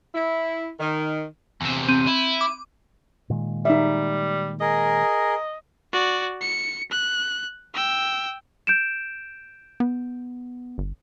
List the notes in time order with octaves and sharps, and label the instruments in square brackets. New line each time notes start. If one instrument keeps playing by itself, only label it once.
[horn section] E4
D#3
[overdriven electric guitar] E2 C3
[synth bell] C4 D#7
[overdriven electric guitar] E4
[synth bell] D6
[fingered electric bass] A#2 D#3 G#3
[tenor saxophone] G3 [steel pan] D#4 E5
[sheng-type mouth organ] G#4 A#4 [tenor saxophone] D#5
[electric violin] F#4 D5
C#7
F#6
G5 E6
[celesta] G6 D7 E7
[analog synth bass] B3
G1